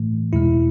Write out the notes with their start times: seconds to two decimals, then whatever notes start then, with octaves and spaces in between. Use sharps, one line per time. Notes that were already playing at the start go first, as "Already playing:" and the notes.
Already playing: A2 E3 A3
0.33 E2 B2 G#3 E4